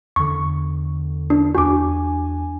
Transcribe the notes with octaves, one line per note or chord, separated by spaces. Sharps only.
E2 D3 C#6
D4
E2 D4 F#4 G#5 D6